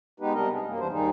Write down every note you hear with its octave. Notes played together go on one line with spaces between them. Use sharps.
G#3 B3 D#4 G4 B4
C3 G3 B3 D4 A#4 D#5
G#4
F#2 A#3
E2 E3 G3 D4 C5
D#2 D#3 G3 D#4 G#4